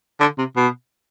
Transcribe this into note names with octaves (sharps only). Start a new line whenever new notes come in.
D3
C3
B2